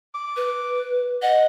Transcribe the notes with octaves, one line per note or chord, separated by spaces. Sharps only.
D6
B4
D#5 F#5